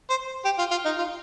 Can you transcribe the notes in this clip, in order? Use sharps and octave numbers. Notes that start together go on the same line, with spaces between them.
C5
G4
F4
F4
D#4
F4